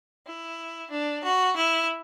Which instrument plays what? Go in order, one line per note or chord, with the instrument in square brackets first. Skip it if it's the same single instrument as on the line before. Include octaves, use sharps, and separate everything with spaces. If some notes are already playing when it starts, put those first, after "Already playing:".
[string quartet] E4
D4
F#4
E4